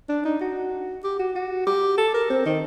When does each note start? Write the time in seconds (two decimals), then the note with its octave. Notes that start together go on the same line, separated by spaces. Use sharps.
0.09 D4
0.25 D#4
0.41 F#4
1.04 G4
1.19 F#4
1.35 F#4
1.67 G4
1.98 A4
2.14 A#4
2.30 C4
2.46 D#3